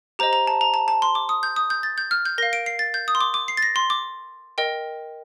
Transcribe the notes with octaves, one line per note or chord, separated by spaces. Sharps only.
G4 C5 D#5 A#5
A#5
A5
A#5
A5
A5
C6
D6
D#6
G6
D#6
G6
A6
G6
F6
G6
A#4 F5 A#6
D7
C7
A6
G6
D#6
C6
D6
D6
C7
A6
A#6
C6
D6
A#4 D#5 G5